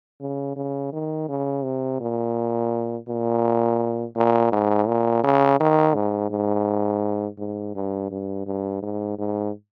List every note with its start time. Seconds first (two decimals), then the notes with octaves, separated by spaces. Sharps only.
0.21 C#3
0.56 C#3
0.93 D#3
1.29 C#3
1.64 C3
2.00 A#2
3.08 A#2
4.16 A#2
4.52 G#2
4.88 A#2
5.24 C#3
5.60 D#3
5.95 G#2
6.30 G#2
7.39 G#2
7.75 G2
8.11 G2
8.46 G2
8.82 G#2
9.18 G#2